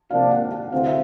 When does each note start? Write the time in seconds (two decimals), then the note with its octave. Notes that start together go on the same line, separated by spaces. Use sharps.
0.10 C3 F3 A#3 D4 F5
0.31 F#5
0.52 F#5
0.72 D2 C3 E3 A3 C4 F5
0.87 E5